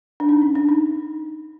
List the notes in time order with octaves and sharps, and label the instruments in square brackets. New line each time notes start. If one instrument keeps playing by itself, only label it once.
[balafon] D4
D#4
C#4
D4
D#4